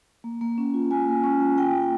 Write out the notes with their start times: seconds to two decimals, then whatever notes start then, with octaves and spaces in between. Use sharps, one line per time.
0.24 A#3
0.41 A#3
0.58 C#4
0.74 F4
0.91 A#3 G#5
1.08 A#3
1.24 C#4
1.40 F4
1.57 A#3 G5
1.74 A#3